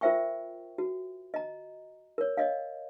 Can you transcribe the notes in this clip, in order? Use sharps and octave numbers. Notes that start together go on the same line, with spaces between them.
F4 A#4 C5 E5 G5 C#6
F#4
D#5 A#5
A#4 C#5
C#5 D#5 F5